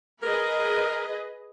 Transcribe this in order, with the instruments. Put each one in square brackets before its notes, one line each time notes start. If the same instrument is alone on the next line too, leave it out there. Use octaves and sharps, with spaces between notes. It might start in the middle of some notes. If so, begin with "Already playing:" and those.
[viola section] G#4 B4 D#5 [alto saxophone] A#4